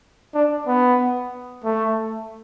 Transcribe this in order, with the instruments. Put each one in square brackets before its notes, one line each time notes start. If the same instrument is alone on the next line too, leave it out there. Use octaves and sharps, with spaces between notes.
[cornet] D4
B3
A3